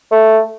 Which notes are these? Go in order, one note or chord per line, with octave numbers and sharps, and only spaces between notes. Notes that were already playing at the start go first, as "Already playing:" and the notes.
A3